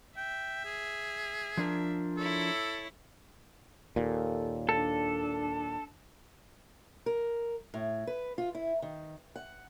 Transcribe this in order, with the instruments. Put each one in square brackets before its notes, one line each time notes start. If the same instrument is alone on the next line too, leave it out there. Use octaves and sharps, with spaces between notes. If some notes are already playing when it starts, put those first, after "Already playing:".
[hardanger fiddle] E5 [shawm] G5
[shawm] G#4
[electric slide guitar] F3 D4 A#4
[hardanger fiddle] E4 C#5 [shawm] A4
[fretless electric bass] D#2 A#2 [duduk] A4
[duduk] D4 [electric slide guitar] A4
[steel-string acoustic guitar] A#4
A2
B4
F4
E4
D#3
F#5